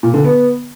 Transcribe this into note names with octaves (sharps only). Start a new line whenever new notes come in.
A#2
D3
B3